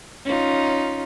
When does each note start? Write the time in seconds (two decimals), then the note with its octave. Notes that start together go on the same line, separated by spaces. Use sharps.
0.25 C#4 D#4 F4